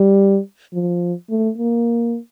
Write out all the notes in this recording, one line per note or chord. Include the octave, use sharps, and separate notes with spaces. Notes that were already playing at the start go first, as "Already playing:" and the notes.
Already playing: G3
F3
A3
A#3